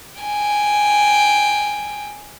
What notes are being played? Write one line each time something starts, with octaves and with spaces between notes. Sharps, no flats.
G5 G#5